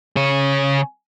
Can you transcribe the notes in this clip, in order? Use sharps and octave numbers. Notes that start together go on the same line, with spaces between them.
C#3 C#5